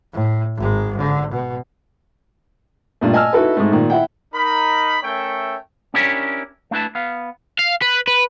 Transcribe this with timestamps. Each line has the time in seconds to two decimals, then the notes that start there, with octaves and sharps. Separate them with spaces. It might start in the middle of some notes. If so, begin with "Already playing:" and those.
0.13 A2
0.57 G#1 G#3
0.96 D3
1.31 B2
3.01 G2 A#2 A3
3.13 D#5 G#5 A5 E6 F6
3.33 D#4 E4 F#4 A4 B4
3.57 G#2 G#3 A3
3.72 A#2 D#3
3.90 E4 E5 F#5 G5
4.34 D#4 A#4 B5
5.03 A3 C#4 A#4 C#5 E5 G5
5.94 C#4 D4 E4 G4 A#4 C#5
6.71 A3 D4 E4 B4 A5
6.95 B3 F5
7.59 F5
7.82 B4
8.07 B4